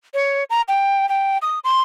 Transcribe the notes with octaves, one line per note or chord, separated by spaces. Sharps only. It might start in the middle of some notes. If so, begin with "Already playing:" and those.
C#5
A#5
G5
G5
D#6
C6